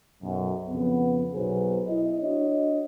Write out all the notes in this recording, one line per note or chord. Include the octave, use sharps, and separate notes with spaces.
B1 F#2
F2 C#3 B3
B1 F#3 G#4 B4 C5
E4 D#5
D4 F#4 C#5 D#5